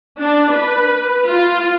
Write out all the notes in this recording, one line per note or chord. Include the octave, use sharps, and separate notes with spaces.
D4
B4
F4